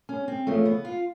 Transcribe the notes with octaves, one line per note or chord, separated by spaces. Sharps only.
C#4
C4
E2 C#3 F3 A3
B3
F4